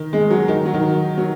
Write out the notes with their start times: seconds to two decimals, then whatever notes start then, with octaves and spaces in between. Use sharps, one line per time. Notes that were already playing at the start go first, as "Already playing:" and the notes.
Already playing: D#3
0.13 G#3
0.30 F#3
0.48 D#3
0.66 F#3
0.74 D#3
1.18 F#3